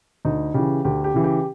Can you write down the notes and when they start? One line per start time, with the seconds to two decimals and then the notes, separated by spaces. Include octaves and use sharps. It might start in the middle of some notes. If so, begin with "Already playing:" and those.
0.25 D2 D#4
0.54 C#3 E3 G4
0.85 D2 G4
1.04 G4
1.14 C#3 E3
1.24 G4